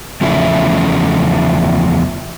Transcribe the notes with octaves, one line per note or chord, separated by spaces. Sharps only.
E2 C#3 F3 A3 E4